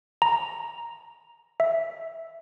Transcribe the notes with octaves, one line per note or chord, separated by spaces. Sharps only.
A#5
E5